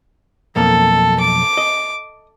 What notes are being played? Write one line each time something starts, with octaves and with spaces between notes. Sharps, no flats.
B1 F2 A#3 A4
D6
D#5